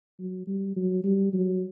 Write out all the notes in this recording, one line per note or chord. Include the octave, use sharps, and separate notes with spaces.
F#3
G3
F#3
G3
F#3